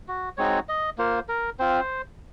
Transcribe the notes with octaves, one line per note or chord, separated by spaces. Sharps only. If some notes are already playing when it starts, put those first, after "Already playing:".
F#4
G#3 C4 D#4 F#4 C#5
D#5
A#3 F4 C5
A#4
C4 F4 C5